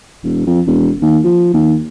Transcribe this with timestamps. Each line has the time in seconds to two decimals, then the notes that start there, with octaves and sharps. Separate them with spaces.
0.23 E1
0.47 F2
0.67 E1
1.02 D#2
1.24 F3
1.54 D#2